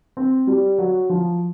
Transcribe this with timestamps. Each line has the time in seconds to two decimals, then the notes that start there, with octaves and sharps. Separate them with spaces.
0.17 C4
0.47 G3
0.78 F#3
1.10 F3